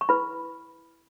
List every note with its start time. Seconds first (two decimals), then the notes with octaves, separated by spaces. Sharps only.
0.01 C#6
0.09 E4 B4 B5